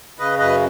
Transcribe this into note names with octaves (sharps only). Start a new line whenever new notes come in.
C#3 B4 D#5
F#2 B4 D#5